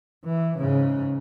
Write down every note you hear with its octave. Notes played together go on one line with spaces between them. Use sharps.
E3
G#2 C#3